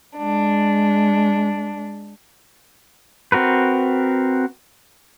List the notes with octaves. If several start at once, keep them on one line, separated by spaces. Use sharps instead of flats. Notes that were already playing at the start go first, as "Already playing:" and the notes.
G#3 D4
C4 F#4 A#4 B4